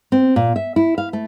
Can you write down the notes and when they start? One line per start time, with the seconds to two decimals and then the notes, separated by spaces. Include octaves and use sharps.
0.12 C4
0.36 A#2
0.56 E5
0.76 E4
0.98 F5
1.13 A3